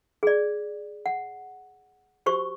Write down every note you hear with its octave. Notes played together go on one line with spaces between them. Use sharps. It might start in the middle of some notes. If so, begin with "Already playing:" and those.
G#4 D5
F#5
F#4 G4 C5 C#6